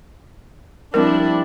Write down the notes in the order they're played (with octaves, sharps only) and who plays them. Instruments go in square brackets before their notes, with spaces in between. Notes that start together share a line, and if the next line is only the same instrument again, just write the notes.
[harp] F3 G3 C4 [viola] D4 E4 [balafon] A#4